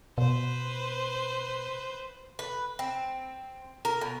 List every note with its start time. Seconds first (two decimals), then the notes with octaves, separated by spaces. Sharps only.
0.18 B2 B4 C5
2.39 B4
2.79 C4
3.85 A#4
4.01 B2